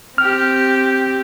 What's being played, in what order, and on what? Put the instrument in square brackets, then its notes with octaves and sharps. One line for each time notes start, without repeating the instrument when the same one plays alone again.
[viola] C4 G4 [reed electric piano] F6